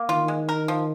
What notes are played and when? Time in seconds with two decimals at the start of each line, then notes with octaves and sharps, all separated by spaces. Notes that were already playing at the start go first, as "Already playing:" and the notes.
Already playing: A#3
0.09 D#3 F4
0.28 G#3
0.49 A#4
0.68 F3